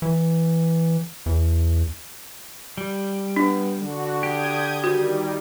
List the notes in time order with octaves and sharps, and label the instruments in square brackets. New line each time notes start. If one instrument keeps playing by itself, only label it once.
[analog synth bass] E3
E2
[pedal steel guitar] G3
[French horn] B3 [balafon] D4
[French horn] D3 [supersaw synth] F#4
[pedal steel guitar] G4 [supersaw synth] D#6 G6 G#6
[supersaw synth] D#3 G3 [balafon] F#4